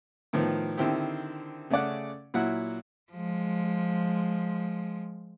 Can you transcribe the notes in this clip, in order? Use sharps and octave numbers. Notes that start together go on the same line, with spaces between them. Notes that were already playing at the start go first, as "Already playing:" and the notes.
A2 D#3 F3 B3
D3 D#3 C4 E4 G4
C#3 A3 C#4 D5 F#5
A#2 F#3 E4 F#5
F3 G#3